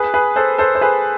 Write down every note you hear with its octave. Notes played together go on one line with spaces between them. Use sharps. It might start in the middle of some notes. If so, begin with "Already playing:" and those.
Already playing: G#4 B4
G#4 B4
A4 C5
A4 C5
C5
G#4 B4